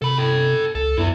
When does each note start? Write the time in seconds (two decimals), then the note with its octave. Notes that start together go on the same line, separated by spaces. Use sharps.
0.02 C3 A4 B5
0.18 A4 G5
0.75 C#2 A4
0.98 F#2 B3 E4